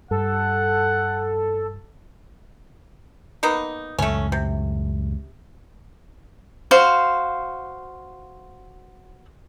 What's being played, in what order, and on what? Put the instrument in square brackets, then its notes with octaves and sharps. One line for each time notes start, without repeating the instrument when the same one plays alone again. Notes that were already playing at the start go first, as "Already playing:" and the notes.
[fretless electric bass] G2 [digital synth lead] A4 [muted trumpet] F#5
[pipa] A#3 B3 D#4
[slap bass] C#2 F#2 A2 [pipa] A3 C#4
[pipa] C3
[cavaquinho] F#4 C5 F5